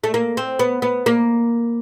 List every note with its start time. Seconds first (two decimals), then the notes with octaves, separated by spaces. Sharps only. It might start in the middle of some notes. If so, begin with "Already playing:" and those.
0.04 A3
0.14 A#3
0.37 C4
0.59 B3
0.82 B3
1.06 A#3